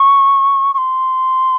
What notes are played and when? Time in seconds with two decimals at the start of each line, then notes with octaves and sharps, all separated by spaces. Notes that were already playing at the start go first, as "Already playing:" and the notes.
Already playing: C#6
0.74 C#6
0.78 C6